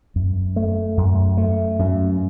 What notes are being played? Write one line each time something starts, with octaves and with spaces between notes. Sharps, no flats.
F#2
A3
F#2
A3
F#2